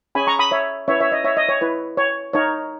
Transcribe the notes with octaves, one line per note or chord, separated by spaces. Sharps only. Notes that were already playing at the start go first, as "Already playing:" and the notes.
C#4 G#4 C#5 G#5 B5
A#5 C#6
B5 D#6
C#5 E5
C#4 E4 B4 C#5 E5
C#5 E5
D#5
C#5 E5
D#5
C#5
E4 B4
C#5
D#4 A#4 C#5